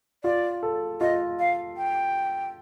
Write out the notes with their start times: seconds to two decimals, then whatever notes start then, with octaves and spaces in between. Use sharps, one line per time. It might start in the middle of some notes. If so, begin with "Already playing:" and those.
0.24 F4 D5
0.63 A4
1.01 F4 D#5
1.39 F5
1.77 G5